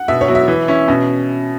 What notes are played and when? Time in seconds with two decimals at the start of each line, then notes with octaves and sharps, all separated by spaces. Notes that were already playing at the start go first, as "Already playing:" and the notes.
Already playing: F#5
0.08 B2 E5
0.21 C#5
0.28 F#3 B3 E4
0.35 E5
0.48 E3
0.68 C#4 E4
0.88 B2 C#4